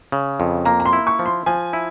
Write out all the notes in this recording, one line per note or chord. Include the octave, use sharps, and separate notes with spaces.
C#3
F2
A#3 A#5
A#5
C6
E4
C#6
F3
C6
F3 G#5
E4